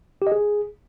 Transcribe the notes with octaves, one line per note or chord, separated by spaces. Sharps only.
G4
D#5
G#4